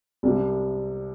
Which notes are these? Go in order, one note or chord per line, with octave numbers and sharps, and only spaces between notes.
C2 C3 G3